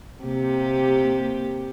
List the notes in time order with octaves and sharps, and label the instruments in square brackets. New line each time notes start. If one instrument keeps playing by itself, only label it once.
[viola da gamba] C3 A#3 G4